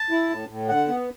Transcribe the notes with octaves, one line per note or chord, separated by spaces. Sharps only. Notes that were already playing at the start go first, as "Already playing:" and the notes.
Already playing: A5
E4
A2
A2
D3 F#5
B3